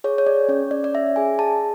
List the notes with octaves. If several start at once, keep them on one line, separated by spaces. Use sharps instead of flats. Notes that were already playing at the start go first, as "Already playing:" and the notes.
G#4 C#5
C#5
G#4 D5
C#4 C#5
C#4 D5
D5
C#4 E5
G#4 G#5
G#4 A5